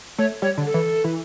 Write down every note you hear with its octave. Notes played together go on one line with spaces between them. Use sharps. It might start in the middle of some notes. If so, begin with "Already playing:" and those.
A3 C#5
G3 C#5
D3
A4
E3
E3